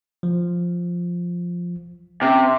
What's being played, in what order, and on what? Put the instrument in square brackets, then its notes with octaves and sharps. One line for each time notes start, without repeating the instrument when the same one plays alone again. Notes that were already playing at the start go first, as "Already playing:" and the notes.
[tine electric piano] F3
[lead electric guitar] C3 [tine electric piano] C#4